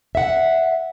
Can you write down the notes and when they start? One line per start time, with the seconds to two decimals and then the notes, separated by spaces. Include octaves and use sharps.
0.15 E5 F#5